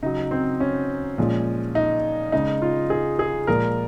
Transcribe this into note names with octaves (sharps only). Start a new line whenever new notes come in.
C#3 F#3 D#4
C4
C#4
A#2 F3 G#3
D#4
C#3 G#3 D#4
F4
G#4
G#4
A#2 F3 G#3 A#4